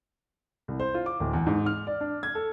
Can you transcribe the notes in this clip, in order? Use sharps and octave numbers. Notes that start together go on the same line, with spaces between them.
C2
C5
F4
D6
D1
E2
G#2
F6
D5
D4
G#6
A4